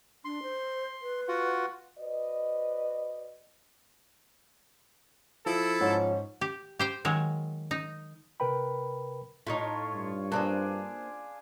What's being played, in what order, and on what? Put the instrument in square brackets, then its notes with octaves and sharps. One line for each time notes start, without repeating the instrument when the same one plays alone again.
[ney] D4 [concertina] C6
[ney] C5
B4
[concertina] F4 F#4 F#5
[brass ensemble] F#4 B4 C5 D5 D#5
[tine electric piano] F3 [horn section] E4 A4
[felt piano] G#2 [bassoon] C#4
[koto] G4
G4 C5 G5
D#3 F#3 G#3
D#4
[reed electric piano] C3 A#4 B4 G5 B5
[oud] A2 D#4 [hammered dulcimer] F4 C#5
[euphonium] G2
[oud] A#3 C4 [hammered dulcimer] D4 G#4